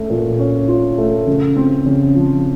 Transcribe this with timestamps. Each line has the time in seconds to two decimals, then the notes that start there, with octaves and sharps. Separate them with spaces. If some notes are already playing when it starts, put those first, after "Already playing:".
Already playing: A3 C#4
0.10 A#2
0.39 C#4
0.68 F4
0.98 A3
1.27 C#3
1.56 C4
1.86 C#3
2.15 F3